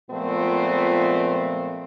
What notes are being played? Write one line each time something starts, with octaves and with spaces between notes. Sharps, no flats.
A#2 F3 G#3 A3 B3 C4